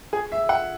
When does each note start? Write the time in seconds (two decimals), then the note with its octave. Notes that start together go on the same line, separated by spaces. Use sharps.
0.13 G#4
0.32 E5
0.49 F#5